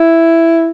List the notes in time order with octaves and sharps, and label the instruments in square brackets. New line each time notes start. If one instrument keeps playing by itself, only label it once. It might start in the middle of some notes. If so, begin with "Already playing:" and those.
Already playing: [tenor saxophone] E4